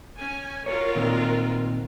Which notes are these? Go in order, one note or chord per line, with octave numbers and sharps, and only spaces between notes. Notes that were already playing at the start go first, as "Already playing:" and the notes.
C#4 G#5
F4 F#4 A#4 C#5
A#2 D#3 C4